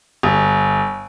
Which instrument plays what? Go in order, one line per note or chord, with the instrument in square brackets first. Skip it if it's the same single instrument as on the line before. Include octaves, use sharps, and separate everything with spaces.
[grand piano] G1